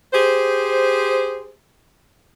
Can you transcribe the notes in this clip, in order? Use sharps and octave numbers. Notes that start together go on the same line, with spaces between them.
G4 G#4 C5